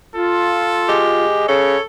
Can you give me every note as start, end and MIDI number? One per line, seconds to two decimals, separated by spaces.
0.16 1.24 65
0.16 1.07 69
0.89 1.45 56
0.89 1.47 67
1.48 1.76 49
1.48 1.84 69
1.48 1.81 73